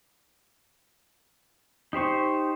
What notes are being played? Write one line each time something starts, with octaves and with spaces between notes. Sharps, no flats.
D#4 G4 C5 C#6